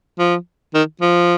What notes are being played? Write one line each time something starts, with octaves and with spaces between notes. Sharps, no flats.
F3
D#3
F3